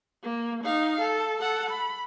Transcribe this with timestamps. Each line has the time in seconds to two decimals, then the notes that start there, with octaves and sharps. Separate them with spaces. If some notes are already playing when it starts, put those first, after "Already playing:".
0.23 A#3
0.64 D#4 F5
1.01 A4
1.41 A4 F#5
1.70 B5